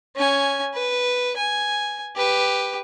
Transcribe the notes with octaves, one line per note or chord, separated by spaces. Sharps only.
C#4 G#5
B4
G#5
G4 B4